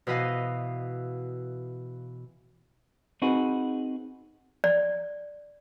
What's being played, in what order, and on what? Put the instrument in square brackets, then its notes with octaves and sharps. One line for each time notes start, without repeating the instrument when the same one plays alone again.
[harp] B2 E3 B4 D#5 F5
[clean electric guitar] C4 D#4 F#4 G#4 B4
[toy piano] D5